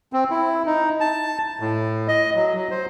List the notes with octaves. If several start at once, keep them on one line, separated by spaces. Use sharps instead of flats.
C4
E4
D#4
A5
A2
D#5
F#3
F#3
C5